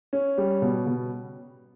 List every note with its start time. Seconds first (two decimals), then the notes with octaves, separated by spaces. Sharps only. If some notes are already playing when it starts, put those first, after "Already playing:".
0.13 C#4
0.38 G3
0.62 B2
0.86 B2